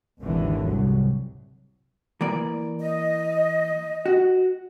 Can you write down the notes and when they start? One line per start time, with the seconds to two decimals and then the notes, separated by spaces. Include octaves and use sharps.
0.20 G#1 D#2 D3 E3
0.65 C2 F#3
2.21 E3 A#3 D5
2.80 D#5
4.06 F#4